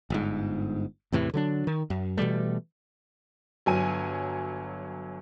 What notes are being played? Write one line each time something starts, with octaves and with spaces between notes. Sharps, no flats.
G1 G#2
E2 A2 C3 E3
D3 F#3 D4
D#3
F#2
B2 E3 G3 A3
G1 F#3 G#5 D#7